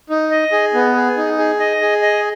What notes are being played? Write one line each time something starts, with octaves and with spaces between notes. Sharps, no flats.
D#4
D#5
G#4
B3
G#4
D#4
G#4
D#5
G#4
D#5